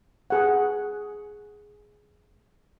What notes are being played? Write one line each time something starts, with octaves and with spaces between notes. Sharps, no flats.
G#4 F#5